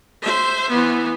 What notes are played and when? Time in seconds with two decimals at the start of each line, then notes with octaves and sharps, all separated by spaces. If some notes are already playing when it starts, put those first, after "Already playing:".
0.22 C5 E5
0.70 E3 B3